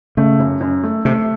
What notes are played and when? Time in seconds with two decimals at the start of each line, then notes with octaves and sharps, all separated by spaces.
0.17 C#3 A3
0.39 F#2
0.61 F#2
0.83 A3
1.05 C3 A3